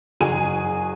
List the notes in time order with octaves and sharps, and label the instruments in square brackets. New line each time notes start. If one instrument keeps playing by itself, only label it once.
[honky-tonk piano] F#1 F#4 G#4 G#5 D#7